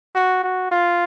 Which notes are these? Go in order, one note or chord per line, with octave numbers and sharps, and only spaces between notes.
F#4
F#4
F4